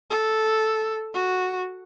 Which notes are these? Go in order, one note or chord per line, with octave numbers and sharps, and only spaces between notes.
A4
F#4